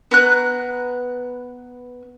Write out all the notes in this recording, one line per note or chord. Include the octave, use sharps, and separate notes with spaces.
B3 A#5 F#6